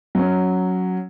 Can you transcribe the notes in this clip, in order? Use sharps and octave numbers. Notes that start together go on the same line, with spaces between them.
F#3 C#4